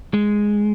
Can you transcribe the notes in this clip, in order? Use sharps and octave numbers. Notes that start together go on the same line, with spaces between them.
G#3